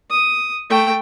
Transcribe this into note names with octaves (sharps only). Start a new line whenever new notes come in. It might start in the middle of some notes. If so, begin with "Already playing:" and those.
D#6
A3 G5